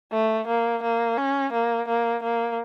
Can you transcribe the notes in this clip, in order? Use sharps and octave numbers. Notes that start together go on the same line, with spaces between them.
A3
A#3
A#3
C#4
A#3
A#3
A#3